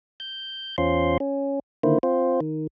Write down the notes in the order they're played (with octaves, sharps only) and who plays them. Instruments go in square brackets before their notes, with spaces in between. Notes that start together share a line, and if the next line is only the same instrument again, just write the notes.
[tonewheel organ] G6
E2 C#4 F4 C5 C6
C#4
D3 D#3 A#3 E4 C5
C4 F4 C5
D#3